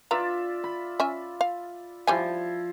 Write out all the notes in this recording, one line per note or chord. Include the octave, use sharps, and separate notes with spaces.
F4 B4 D5 E5 A#5
B5
C#4 E5 G#5
F5
F3 G3 E4 G4 G#5